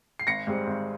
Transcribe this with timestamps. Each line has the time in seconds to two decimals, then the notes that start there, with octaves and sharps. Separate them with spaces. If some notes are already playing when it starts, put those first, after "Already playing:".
0.19 C7
0.27 G#1 A#6 C#7
0.47 G#2 G3 C4
0.67 G#1